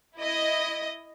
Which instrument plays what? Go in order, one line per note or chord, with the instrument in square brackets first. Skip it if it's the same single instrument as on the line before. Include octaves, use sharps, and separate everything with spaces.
[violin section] E4 D#5